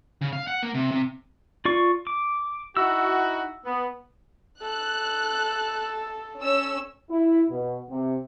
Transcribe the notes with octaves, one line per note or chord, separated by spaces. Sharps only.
C#3
F5
F#5
A#3
C3
C3
F4 D5 C#6
D6
D#4 E4 F#4 E6
B3
A4 F#6
C#4 E6
E4
B2
C3